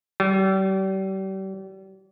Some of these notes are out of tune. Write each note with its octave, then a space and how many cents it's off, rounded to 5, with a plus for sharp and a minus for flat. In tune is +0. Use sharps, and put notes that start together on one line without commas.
G3 -35